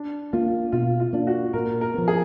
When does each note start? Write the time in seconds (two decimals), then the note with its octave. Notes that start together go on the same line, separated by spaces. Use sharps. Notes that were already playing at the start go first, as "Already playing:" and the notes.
Already playing: D4
0.33 A#3 D4 F4
0.72 B2 F4
1.00 F4
1.13 A#3 D4
1.27 F#4
1.53 A#2 A#4
1.81 A#4
1.94 F3 B3
2.08 G#4